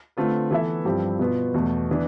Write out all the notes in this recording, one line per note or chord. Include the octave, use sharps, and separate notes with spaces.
D3 A3 C4 F4 B4
E3 B3 E4 A4 E5
G2 F3 C4 E4 G4
B2 B3 F4
E2 B2 A3
E3 B3 D4